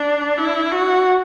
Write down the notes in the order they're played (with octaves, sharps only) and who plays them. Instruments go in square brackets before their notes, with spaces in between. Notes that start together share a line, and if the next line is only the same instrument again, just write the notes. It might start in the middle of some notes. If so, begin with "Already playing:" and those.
Already playing: [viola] D4
E4
F#4